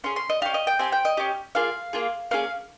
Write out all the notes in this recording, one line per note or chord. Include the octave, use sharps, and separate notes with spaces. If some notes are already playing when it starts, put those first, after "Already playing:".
C#4 G#4 C6
C6
D#5
C#4 G4 F5
D#5
G5
C4 G4 G#5
G5
D#5
C#4 G4
A#3 F4 G#4 F5
A#3 F4 G#4
A#3 C#4 G#4 F5